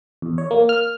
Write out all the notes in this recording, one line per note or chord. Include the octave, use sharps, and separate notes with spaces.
E2
C#5
A#3
F6